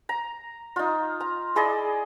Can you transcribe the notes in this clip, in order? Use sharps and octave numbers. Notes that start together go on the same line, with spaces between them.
A#5
D#4 F4
A#5
E4 G#4 D5 D#5